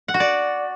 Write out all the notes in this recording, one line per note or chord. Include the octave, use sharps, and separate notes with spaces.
F#5
F#4
D5